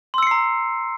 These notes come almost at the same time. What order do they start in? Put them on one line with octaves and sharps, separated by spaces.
C6 E6 C#7 C7 A#5